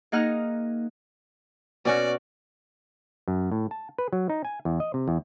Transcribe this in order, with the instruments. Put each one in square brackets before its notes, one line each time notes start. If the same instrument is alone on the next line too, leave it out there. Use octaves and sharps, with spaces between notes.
[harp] A#3 D#4 G#4 D#5 F#5 F6
[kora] B2 C#4 F#4 [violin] D5
[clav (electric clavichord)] F#2
A2
A5
B4
F#3
D#4
G#5
E2
D#5
C3
E2